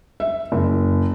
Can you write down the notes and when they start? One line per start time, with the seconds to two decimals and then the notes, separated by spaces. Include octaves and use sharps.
0.20 E5
0.52 F#1